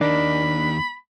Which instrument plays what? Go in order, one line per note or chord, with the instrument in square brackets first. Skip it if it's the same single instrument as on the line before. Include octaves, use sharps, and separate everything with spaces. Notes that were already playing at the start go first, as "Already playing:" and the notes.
[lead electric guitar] D#2 D#4 [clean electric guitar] D4 A#4 D5 [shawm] B5